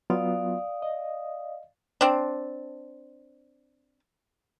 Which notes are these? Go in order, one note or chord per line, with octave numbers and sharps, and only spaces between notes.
F#3 B3 F4 D5 F5 D#6
D#5
C4 D4